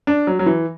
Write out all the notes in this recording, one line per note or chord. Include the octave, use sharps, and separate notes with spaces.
D4
F#3
F#3
E3